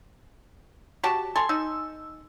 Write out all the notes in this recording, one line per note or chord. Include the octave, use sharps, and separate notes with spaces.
F#4 G4 A5
A4 G#5 C6
D#4 E6